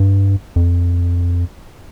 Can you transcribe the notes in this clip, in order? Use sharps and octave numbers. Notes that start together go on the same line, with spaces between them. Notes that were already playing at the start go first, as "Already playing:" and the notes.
Already playing: G2
F2